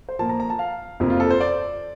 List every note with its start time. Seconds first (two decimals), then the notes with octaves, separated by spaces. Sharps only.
0.09 C5
0.19 A#2 F3 A#3 A5
0.29 A#5
0.40 A#5
0.50 A5
0.59 F5
1.00 F2 C3 F3 A#3
1.10 F4
1.20 A4
1.31 C5
1.40 D5